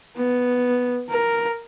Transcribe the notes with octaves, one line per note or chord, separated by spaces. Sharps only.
B3
A#4